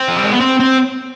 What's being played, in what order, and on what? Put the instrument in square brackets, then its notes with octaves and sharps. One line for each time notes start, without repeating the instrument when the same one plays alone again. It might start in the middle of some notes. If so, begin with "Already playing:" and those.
Already playing: [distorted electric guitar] C4
F3
G3
G#3
B3
C4
C4